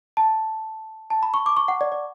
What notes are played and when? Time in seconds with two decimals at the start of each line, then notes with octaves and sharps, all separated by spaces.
0.17 A5
1.10 A5
1.23 B5
1.34 C#6
1.46 D6
1.57 C#6
1.68 F#5
1.81 D5
1.92 D5